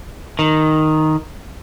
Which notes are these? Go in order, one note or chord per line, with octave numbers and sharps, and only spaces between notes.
D#3